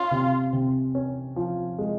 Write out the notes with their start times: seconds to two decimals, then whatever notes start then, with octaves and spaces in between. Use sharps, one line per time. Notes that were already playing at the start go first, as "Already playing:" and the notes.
Already playing: C#4 F4
0.11 C3
0.53 C3
0.95 C#4
1.36 F3
1.78 G#3